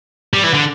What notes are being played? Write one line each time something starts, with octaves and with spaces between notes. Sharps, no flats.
G3
E3
D3